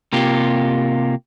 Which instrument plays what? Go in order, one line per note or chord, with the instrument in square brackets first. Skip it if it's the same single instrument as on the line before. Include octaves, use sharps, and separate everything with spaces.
[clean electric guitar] C3 A#3 F4 G4